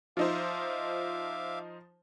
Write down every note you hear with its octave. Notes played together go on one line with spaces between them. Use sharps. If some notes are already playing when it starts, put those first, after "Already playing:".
F3 D#4 C5 E5 F5 D6